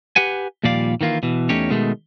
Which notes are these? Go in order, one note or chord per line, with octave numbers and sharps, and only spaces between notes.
G4 B4 F#5 G#5
D#2 A#2 F3 G3 D5 F5
D#3 E3 A#3 F4
B2 E3
E2 A3 C#4 D#4 G4 C#5
B2 D#3 G#3 A3